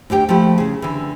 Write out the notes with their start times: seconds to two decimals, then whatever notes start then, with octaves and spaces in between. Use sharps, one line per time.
0.10 D2 D3 G4 G5
0.29 F3 A3 A#3 D#4 E4 G4
0.58 C#3 G#4
0.82 D3 E3